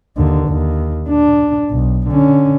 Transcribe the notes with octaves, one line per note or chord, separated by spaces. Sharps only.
D#2 D3
D#2
D4
B1
D3 C#4